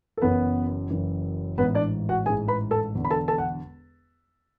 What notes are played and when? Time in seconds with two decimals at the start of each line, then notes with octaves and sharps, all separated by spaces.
0.17 A4
0.22 F#1 F#2 E3 B3 B4
0.90 F#1 F#2 E3
1.58 A1 G#2 E3 B3 B4
1.75 D4 D5
2.09 F#4 F#5
2.26 A1 G#2 E3 G#4 G#5
2.48 B4 B5
2.71 A4 A5
2.94 E1 E2 D3
3.05 B5
3.11 A4 A5
3.28 A4 A5
3.38 F#5